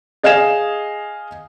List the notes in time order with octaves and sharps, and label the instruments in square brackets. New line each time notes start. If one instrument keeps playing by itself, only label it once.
[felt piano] G#4 D#5 F5 G#5 E7